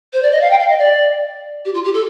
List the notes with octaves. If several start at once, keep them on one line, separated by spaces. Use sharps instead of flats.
C5
D5
D#5
F5
G5
F5
D#5
D5
G4
F4
G4
A4